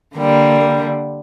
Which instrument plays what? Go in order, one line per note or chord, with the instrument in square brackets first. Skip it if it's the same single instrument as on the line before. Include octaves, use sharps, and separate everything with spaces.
[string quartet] D3 G3 A#3